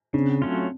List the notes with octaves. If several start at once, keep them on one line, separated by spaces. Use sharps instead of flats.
C#3 C4 D4
F#3 A3 C#4 F4